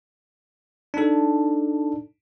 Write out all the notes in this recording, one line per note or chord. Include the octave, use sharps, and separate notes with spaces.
D4 D#4 A4